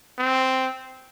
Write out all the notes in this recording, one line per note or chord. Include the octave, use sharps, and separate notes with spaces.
C4